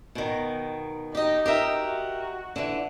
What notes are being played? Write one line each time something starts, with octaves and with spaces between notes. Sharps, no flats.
B2 D#3
D#4 G4 D#5
G4 A#4 E5
F#4
D3 E3